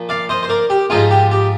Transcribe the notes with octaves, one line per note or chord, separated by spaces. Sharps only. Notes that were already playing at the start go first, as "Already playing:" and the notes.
Already playing: A#2 F3 A#3
D5 F5
C5 D#5
C5
A#4 D5
G4
G#2 F3 G#3 D#4 F4 G#4
G4
G4